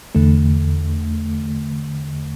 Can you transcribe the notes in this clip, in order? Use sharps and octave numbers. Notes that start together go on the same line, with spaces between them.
E2 D3 A3